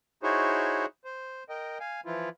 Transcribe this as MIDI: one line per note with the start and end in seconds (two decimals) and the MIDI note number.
0.23 0.86 63
0.23 0.86 64
0.23 0.86 66
0.23 0.86 68
0.23 0.86 72
0.23 0.86 73
1.05 1.44 72
1.49 1.78 70
1.49 1.78 75
1.49 1.78 79
1.80 2.01 77
1.80 2.01 80
2.06 2.29 52
2.06 2.29 53
2.06 2.29 64
2.06 2.29 65